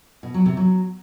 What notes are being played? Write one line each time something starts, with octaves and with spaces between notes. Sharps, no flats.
B2
F#3
C3
F#3